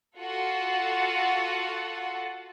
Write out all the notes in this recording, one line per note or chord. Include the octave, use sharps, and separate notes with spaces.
F4 F#4 A4 F#5